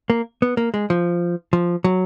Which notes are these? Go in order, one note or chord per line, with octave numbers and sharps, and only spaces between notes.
A#3
B3
A#3
G#3
F3
F3
F#3